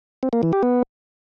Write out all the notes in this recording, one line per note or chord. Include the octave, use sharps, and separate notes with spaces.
C4
A#3
E3
G4
B3